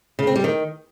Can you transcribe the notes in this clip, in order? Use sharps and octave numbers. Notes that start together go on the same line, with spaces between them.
C#3
C4
G3
D#3